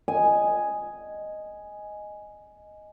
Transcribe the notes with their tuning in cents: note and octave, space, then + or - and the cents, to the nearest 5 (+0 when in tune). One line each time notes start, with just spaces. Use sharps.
D#5 +0 G#5 +0